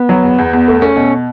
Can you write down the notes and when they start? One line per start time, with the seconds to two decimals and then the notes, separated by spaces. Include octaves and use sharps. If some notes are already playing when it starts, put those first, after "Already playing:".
Already playing: B3
0.09 F#3
0.23 E2
0.38 E2
0.53 E2
0.68 A3
0.82 A3 C#4
0.96 B2